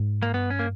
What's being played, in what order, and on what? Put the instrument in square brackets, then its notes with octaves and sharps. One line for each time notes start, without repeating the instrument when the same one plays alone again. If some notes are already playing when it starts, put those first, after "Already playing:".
Already playing: [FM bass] G#2
[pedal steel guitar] A#3
[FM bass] G2 [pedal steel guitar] B3
[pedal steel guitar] C#4
A#3